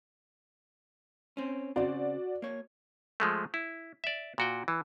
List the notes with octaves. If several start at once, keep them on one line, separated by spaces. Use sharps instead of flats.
C4 C#4
C#3 C4 F#4 D5
A#3 C#5
F3 G#3 A3
E4
D5 E5
A#2 F#4 G5
E3